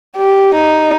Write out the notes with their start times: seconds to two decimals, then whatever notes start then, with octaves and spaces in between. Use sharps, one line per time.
0.17 G4
0.55 D#4